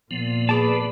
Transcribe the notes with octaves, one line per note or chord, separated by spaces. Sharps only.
A#2 F3 B3
G#4 B4 D5 A5